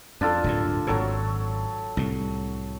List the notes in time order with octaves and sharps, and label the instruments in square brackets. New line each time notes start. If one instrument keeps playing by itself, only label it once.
[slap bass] F2 [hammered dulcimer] D4 F4 A4
[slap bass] D1 G2 A#2
[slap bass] G#1 A#2 [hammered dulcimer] F#3 A4 C#5
[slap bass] C2 A2